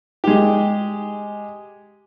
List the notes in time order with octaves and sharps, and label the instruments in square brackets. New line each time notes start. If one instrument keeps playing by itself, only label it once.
[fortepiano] G#3 G4